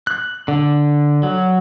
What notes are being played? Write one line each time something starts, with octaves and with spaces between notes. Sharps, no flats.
F#6
D3
F#3